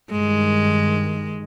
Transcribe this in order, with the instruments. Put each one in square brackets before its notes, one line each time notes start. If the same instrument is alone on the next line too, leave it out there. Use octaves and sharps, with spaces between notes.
[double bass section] G2 D#3 [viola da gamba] G#3